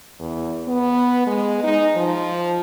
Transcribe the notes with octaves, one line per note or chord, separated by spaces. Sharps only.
E2
B3
G#3
D#4
F3